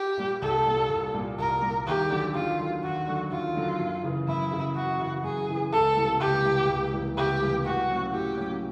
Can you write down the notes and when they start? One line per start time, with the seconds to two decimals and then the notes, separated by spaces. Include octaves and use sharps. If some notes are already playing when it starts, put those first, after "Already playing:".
Already playing: G4
0.18 A#2 G3
0.42 C2 A4
0.66 A#2 G3
0.90 C2
1.14 A#2 G3
1.38 C2 A#4
1.62 A#2 G3
1.86 D#2 G4
2.10 D3 F#3
2.34 D#2 F4
2.59 D3 F#3
2.83 D#2 F#4
3.08 D3 F#3
3.31 D#2 F4
3.55 D3 F#3
3.80 F#2
4.03 C#3 E3
4.28 F#2 E4
4.52 C#3 E3
4.75 F#2 F#4
5.00 C#3 E3
5.23 F#2 G#4
5.48 C#3 E3
5.72 C#2 A4
5.96 C3 E3 G3 A#3
6.20 C#2 G4
6.44 C3 E3 G3 A#3
6.69 C#2
6.93 C3 E3 G3 A#3
7.17 C#2 G4
7.41 C3 E3 G3 A#3
7.65 A2 F#4
7.90 F#3 A#3 C#4
8.13 A2 G4
8.37 F#3 A#3 C#4